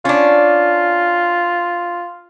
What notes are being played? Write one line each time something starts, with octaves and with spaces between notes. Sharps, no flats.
C#4 D4 F4